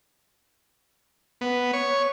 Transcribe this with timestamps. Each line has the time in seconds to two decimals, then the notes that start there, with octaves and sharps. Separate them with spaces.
1.41 B3
1.73 C#5